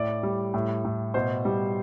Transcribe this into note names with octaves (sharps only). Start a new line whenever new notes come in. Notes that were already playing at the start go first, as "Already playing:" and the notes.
Already playing: A2 D5
G3
A2
A2
B2 C5
G3